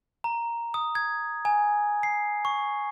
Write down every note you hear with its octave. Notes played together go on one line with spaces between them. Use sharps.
A#5
D#6
G#6
G#5
C7
C#6